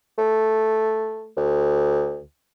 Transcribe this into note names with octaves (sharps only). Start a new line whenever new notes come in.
A3
D2